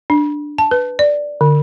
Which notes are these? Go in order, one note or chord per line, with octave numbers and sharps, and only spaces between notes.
D4
A5
B4
D5
D3